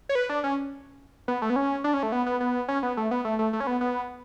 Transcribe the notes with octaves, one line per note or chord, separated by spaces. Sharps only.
C#5
B4
D4
C#4
B3
A3
B3
C#4
D4
C#4
A3
B3
B3
B3
C#4
B3
A3
B3
A3
A3
A3
C#4
B3
B3